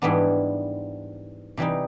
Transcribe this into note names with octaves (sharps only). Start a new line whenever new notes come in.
G#2 E3 G3 B3 D4
C3 E3 G3 C4 D#4